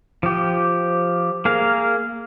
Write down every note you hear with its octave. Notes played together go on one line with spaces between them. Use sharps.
F3 G4
A#3 G#4 A#4 F5